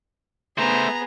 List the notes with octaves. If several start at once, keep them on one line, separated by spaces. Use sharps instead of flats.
A3 B3 G#4 C5 A#5